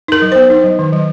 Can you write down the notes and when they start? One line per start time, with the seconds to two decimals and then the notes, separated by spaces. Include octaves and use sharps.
0.08 D#4 A#4
0.22 F#3
0.32 B3 C5
0.50 D#4
0.64 F#3
0.79 D#3
0.93 F#3